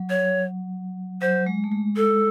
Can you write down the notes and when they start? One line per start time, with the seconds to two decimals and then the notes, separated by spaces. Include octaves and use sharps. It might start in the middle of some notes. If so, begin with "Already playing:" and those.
Already playing: F#3
0.10 C#5
1.21 F#3 C5
1.46 G#3
1.64 A3
1.72 G#3
1.96 A4